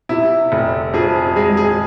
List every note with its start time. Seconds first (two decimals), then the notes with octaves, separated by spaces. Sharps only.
0.09 C3 E4
0.52 F1
0.93 F2 G#4
1.15 G#4
1.36 G#3 G#4
1.57 G#4